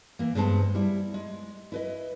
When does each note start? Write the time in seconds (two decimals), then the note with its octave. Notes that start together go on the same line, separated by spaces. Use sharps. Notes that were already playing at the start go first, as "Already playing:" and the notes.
0.19 E3 A#3
0.35 G2 G#3 B3 C5 G#5 A5
0.75 G3 E4
1.14 G#3
1.72 E4 B4 D#5